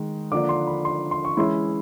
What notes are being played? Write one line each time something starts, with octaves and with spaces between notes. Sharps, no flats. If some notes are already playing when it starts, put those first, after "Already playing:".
Already playing: D#3 G#3
D3 F3 A#3 D4 D6
C6
B5
C6
C6
C#6
E3 G#3 C#4 E4 C6